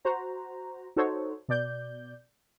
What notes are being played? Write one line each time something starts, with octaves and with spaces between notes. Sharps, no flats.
F#4 C5 A#5
D#4 F#4 A4 C5 C#5
B2 D5 G6